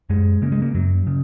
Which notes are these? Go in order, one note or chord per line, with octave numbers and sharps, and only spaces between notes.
F#2 G#3
C#3 A#3
G#3
A#3
F#2 F#3
C#3